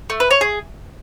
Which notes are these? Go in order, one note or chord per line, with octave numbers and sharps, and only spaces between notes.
A3
B4
C#5
G#4